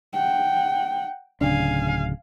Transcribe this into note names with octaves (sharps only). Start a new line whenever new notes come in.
F#5 G5
D1 C#3 D4 F5 G#5